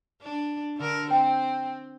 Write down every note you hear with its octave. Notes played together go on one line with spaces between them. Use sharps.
D4
D3 A#4
C4 G5